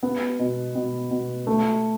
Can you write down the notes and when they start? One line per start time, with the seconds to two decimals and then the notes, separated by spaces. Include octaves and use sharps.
0.03 B3
0.39 B2
0.75 B2
1.11 B2
1.47 A3